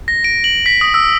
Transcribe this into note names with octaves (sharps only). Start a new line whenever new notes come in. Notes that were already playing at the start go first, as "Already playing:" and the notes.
A#6
D7
F#7
B6
D#6
E6